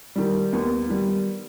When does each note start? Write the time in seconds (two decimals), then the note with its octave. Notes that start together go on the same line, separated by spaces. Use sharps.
0.16 D#3 G3
0.53 D#2 B3
0.89 D#3 G3